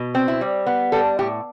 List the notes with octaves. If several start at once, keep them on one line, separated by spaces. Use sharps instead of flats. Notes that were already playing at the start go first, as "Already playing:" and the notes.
Already playing: B2
C4
E4
G3
B3
G3 A4
A2 G4